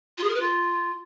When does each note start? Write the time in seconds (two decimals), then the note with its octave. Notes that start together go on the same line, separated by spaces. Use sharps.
0.18 F4
0.23 G#4
0.29 A#4
0.34 B4
0.40 F4